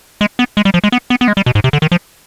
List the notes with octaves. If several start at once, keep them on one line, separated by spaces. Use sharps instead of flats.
G#3
B3
G#3
G3
F3
G#3
B3
B3
B3
G#3
G3
B2
G#2
C3
D3
D#3
F3